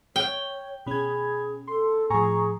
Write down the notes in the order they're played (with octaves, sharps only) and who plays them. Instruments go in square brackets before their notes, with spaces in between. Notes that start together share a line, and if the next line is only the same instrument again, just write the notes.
[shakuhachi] C#5 [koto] G5
[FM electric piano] B2 C#4 [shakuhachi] G#4 [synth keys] B5 G#6
[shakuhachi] A4 [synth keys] C6
[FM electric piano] A2 F3 [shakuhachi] G#4 [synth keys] G#5 A#5 C#6